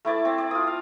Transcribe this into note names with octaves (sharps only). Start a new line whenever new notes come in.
A3 E4 D5 A5
C4
D5
F4 D#6
F5